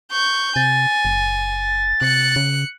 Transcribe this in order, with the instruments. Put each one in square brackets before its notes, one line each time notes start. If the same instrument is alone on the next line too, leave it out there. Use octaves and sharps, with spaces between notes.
[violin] C#6 G6
[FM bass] C3 [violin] G#5 [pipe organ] A6
[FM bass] F#1
[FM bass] C3 [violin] F#6 C#7
[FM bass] C#3